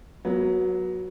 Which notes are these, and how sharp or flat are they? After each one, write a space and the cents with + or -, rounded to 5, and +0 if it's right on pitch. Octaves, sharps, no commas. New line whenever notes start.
F#3 +0 B3 -35 F4 +25